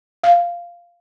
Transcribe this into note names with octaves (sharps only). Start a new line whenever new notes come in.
F5